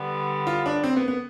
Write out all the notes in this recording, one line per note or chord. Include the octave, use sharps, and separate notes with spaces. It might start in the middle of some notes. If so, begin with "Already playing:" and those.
Already playing: D3 G3 B3
F4
D4
C4
B3
B3